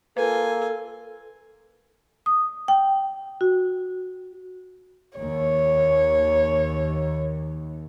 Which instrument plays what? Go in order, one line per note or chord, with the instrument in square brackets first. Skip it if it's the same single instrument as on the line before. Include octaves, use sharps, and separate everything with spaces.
[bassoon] A#3 [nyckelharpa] F4 G#5 [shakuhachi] A4 [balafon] B4
[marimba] D#6
G5
F#4
[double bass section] D#2 [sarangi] C#5